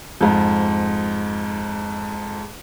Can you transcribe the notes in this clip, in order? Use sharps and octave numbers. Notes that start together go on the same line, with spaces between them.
F2 G#2